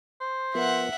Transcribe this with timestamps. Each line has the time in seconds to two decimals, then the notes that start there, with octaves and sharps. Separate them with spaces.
0.21 C5
0.55 F3 B3 A#4 E5 F#5